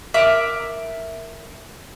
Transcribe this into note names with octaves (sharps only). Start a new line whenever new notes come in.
A#4 E5 D6 F#6